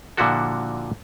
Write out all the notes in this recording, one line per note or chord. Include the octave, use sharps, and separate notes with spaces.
A#2 D3 F3 E4 F#4 A4